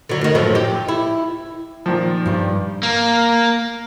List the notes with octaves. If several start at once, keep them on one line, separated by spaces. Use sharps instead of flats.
D3 F#3
D2 D#3
F#2 A2 F3
G4
E4
A#2 D#3 F3
G2 G4
A#3